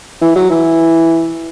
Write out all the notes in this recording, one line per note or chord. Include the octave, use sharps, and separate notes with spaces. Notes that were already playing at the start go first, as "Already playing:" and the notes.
E3
F#3
E3